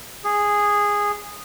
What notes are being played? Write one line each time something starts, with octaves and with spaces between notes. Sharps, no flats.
G#4